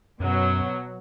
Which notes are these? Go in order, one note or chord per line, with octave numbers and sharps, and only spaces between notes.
F#2 B2 F#3